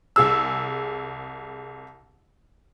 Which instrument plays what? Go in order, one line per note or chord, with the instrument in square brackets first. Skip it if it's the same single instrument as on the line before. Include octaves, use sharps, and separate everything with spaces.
[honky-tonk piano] C2 G#4 E6